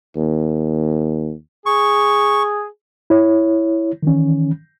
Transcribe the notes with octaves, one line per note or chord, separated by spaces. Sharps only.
D#2
G#4 C#6
E4 C#5
D#3 E3 C#4